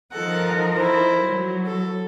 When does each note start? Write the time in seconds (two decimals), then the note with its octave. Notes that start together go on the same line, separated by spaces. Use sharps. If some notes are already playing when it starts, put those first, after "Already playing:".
0.12 F3 D#4 A4 A#4 F#5
0.75 E4 C5
1.23 F#3
1.66 A4